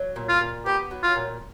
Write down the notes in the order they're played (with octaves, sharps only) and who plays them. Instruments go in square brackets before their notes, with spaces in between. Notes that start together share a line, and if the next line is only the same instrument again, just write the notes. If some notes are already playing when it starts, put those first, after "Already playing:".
Already playing: [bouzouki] F#3
A#2
[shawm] F4
[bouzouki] A#2
[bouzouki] B3 [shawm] G4
[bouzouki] F#3
[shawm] F4
[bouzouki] A#2